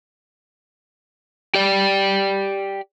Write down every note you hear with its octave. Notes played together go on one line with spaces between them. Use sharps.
G4 D5